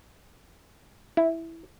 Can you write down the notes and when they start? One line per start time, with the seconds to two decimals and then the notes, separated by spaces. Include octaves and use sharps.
1.17 E4